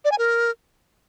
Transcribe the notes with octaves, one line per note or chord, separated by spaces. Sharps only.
D5
G#5
A#4